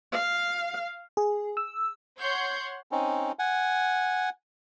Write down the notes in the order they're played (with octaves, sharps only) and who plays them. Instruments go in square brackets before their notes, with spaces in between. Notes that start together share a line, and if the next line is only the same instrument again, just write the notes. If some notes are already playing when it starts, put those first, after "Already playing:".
[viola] F5
[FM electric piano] G#4
E6
[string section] C#5 F#5 C6 G6 G#6 C7
[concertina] C4 C#4 D#4
F#5 G#5